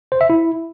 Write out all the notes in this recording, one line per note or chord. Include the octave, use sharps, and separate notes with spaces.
C5
E5
E4